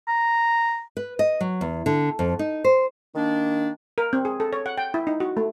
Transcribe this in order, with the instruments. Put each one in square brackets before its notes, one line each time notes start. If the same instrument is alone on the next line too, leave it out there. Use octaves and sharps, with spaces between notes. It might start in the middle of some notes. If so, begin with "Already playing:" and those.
[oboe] A#5
[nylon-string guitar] B4
D#5
F#3
E2
D3
F2
D#4
C5
[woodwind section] D#3 A#3 D4
[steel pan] A#4
C4
G#4
A4
C#5
F#5
G5
E4
D#4
F#4
A3